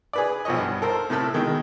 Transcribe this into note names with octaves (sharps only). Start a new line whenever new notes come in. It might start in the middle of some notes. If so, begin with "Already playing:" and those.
G#4 B4 D5
B1 F3 C#5 D#5
G2
A4 A#4 C5
A2 C3 A3 A4 E6 F6
B2 D#3 G#3